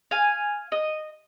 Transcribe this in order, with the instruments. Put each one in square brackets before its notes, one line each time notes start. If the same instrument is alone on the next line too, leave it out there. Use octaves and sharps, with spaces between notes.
[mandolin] F5 G#5
D#5